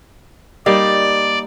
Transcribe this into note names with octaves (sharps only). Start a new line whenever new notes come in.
G3 A#3 D#4 D5